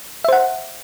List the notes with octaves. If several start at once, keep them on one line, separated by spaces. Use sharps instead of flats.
C5 E5 F#5